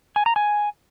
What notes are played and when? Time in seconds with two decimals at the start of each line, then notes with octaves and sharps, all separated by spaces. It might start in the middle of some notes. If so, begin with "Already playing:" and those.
0.16 G#5
0.26 A#5
0.36 G#5